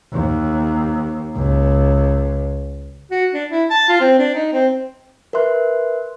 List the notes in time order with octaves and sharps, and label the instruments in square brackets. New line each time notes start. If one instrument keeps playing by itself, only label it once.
[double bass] D#2
C#2
[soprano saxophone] F#4
D4
E4
A5
F4
C4
D4
D#4
C4
[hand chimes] A#4 B4 E5 C6 F#6